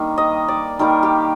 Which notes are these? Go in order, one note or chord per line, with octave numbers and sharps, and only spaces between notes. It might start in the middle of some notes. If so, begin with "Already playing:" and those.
Already playing: D#3 G3 A#3
D#5
D5
D#3 G3 A#3 A#4
G4